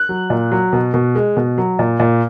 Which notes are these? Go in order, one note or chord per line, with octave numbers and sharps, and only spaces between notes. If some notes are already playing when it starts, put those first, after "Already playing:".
Already playing: F#6
F#3
A#2
F#3
B2
B2
G#3
B2
F#3
A#2
A#2